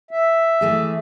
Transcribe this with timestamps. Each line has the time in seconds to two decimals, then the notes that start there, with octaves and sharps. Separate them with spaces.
0.11 E5
0.61 E3 A3 G#4